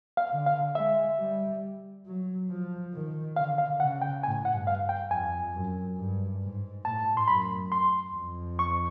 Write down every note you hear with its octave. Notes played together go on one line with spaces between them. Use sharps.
F5
D3
F5
G#3 E5
G3
F#3
F3
D#3
D3 F5
F5
C#3 F#5
G5
A2 G#5
F#5
G2
F5
G5
F2 G#5
F#2
G2
G#2
A2 A5
C6
F#2 B5
C6
F2
C#6